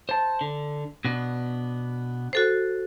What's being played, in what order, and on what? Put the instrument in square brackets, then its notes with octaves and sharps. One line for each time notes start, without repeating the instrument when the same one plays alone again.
[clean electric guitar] C5 A5
D3
B2 B3 D4
[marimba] F#4 A4 C5